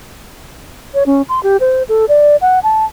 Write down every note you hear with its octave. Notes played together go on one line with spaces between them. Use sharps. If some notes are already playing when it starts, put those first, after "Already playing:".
C#5
C#4
C6
G4
C5
A4
D5
F#5
A5